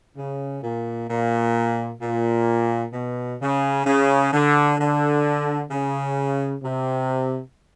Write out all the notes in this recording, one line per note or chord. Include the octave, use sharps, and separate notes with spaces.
C#3
A#2
A#2
A#2
B2
C#3
C#3
D3
D3
C#3
C3